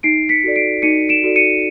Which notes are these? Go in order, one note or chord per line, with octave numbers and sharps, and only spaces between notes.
D#4 C7 D7
B6 C#7
F#4 A4 D5
C7 D7
D#4 C#7 D#7
D7 E7
F#4 A4 D5
C#7 D#7